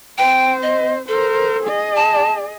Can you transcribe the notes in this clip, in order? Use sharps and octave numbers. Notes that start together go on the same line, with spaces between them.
C4 C5 G5
D#5
A4 A#4 C5
G#4 D#5
A5